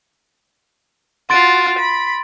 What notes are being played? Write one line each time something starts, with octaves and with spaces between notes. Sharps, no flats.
F4 F#4 C6 A6 D7
B5